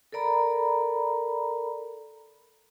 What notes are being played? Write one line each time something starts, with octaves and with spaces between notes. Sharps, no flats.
A4 A#4 D5 A#5 B5